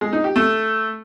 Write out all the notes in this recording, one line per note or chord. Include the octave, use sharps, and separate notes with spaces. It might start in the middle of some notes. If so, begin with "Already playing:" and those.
G#3
D#4
G4
A3